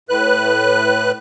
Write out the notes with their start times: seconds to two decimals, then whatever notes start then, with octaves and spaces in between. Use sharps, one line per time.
0.09 A2 B4 F#6